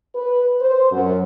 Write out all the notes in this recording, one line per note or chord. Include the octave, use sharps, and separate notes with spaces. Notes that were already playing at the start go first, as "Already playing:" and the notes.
B4
C5
F#2